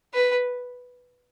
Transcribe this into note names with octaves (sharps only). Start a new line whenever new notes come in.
B4